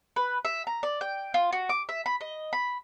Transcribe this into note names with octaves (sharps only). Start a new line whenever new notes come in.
B4
E5
A#5
D5
G5
F4
F#4
D6
E5
B5
D#5
B5